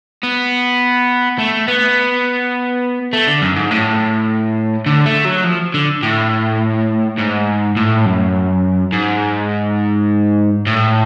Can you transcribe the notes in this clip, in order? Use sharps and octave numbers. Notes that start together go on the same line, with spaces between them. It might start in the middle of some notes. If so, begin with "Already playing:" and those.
B3
A3
B3
A3
D3
F#2
G#2
A2
D3
A3
F#3
F3
D3
A2
G#2
A2
F#2
G#2
A2